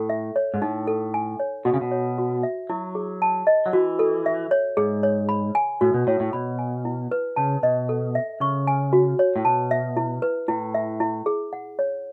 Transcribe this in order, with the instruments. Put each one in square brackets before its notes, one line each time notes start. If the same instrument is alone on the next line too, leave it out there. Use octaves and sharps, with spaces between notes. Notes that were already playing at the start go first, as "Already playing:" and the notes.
Already playing: [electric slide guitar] A2 [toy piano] A4
[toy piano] E5
C#5
[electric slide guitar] G#2
[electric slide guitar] A2 [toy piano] D#4
[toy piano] A4
G#5
C#5
[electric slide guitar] B2 [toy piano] F#4
[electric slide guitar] C#3
B2
[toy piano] C#5
F#4
E5
[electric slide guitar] F#3 [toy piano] E4
[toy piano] G#4
A5
D#5
[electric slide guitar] F#3
[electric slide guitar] E3 [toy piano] F#4
[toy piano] A4
E5
C#5
[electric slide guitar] G#2 [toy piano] G#4
[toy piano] C#5
B5
G#5
[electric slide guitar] A2 [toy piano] F#4
[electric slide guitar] B2
[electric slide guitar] A2 [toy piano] C#5
[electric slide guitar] A2
[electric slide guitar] B2 [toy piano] B5
[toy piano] G#5
E4
B4
[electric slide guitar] C#3 [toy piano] A5
[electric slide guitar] B2 [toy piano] D#5
[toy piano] A4
E5
[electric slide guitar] C#3 [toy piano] C#6
[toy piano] G#5
F#4
C#5
[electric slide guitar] A2
[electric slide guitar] B2 [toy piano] A5
[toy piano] E5
E4
B4
[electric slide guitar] A2 [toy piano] E4
[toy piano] E5
E4
G#4
F#5
C#5